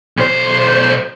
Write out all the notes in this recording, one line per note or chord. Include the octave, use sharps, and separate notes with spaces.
B1 C5